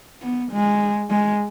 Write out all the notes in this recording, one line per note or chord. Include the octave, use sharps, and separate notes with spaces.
B3
G#3
G#3